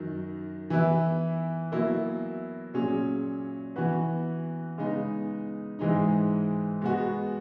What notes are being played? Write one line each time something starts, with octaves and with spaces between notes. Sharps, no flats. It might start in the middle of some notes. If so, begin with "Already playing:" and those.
Already playing: F#2 D#3 F#3
E3 B3 E4 B4
B2 F#3 A#3 E4
A#2 F#3 C#4 G#4
E3 B3 F#4 B4
C#3 G#3 B3 D#4
G#2 E3 G#3 D#4
B2 G#3 B3 F#4